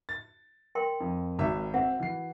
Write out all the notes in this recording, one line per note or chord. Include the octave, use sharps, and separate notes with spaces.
A6
A#4 G5 C6
F2
G#1 F#4 E5
C4 E5 F#5
E3 C7